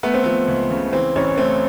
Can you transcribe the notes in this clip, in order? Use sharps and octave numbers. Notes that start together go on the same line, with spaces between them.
A3 B3
C4
F3 B3
C#2
C#3
E3 C4
A1 C#4
A3 C4